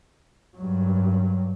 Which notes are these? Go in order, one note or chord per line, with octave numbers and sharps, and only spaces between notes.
G2 F#3